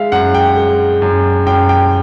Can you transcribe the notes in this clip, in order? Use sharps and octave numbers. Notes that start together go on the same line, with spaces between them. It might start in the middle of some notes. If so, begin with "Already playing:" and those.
Already playing: G#3 E5 F5
F#2 F#5
G5
G#3
F#2
F#2 G5
G5